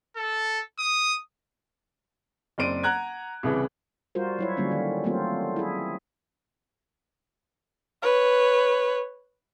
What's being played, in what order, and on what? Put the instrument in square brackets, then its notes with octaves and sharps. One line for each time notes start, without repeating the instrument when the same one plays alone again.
[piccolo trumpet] A4
D#6
[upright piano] F#1 C4 C5 D5 D7 D#7
F#5 A#5 F#6 G#6
C2 C#3 E3
[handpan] G3 F4 F#4 A#4 C5
F#3 E4 C#5
D3 F#3 G3 A#3 C#4
D#3
F#3 A3 A#3 C4 F4
E4 G#4
[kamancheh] B4 C#5